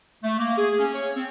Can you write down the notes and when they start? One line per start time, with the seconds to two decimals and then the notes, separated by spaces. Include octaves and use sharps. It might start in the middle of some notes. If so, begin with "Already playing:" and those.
0.24 A3
0.39 A#3
0.57 G#4
0.79 C#4
0.93 C#5
1.15 C4